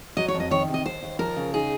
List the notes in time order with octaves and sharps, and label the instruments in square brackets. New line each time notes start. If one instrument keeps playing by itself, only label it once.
[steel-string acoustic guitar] F#3 D#5
C#5
F2
D#5
D#3 C#5
C3
D#5
D#2 C5
D#2
F3 A#4
C#3
D#4 G#4